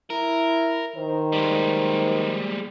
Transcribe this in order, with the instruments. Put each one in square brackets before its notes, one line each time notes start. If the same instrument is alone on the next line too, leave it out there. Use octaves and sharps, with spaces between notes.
[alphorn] E4 [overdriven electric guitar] A#4
[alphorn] D#3 [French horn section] C5
[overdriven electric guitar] G3 G#3